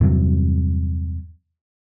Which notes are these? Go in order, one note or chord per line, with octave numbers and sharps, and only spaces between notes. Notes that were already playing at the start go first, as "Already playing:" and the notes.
E2 G2 C3 F#3